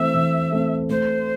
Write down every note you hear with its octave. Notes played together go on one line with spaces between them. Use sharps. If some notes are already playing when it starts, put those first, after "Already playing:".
Already playing: E3 A3 C4 E5
E3
A3 C4
A3 C5